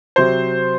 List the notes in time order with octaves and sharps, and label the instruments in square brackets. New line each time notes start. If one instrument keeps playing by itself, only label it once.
[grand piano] C3 F#3 C5